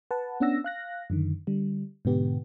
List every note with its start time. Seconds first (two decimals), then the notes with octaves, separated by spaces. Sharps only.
0.11 B4 F#5 A5
0.40 B3 C#4 D4 F#5 E6 A#6
0.64 F5 F#6 A#6
1.10 F#2 D3 D#3
1.47 D3 G3
2.05 G#2 B2 D3 B3 G4